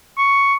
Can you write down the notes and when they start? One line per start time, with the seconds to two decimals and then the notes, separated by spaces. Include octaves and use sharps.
0.18 C#6